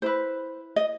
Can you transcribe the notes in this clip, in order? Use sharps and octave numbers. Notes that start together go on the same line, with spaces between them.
E4 B4 C5
D#5